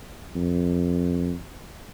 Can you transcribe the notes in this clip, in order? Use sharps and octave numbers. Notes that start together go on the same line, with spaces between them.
F2